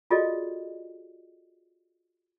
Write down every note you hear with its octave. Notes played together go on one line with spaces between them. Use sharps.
F4 F#4 G#4 A4 D5 D#5